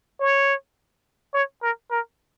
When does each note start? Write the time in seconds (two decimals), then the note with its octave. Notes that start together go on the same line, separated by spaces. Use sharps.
0.20 C#5
1.34 C#5
1.62 A#4
1.91 A#4